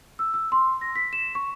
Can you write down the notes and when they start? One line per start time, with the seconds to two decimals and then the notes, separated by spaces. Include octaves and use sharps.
0.19 E6
0.34 E6
0.52 C6
0.81 A#6
0.96 B6
1.13 E7
1.35 C#6